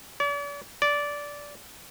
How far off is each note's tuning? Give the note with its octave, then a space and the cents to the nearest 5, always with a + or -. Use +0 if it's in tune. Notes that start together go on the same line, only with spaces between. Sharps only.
D5 -45
D5 -15